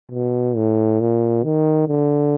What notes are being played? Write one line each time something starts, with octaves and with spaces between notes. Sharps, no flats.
B2
A2
A#2
D#3
D3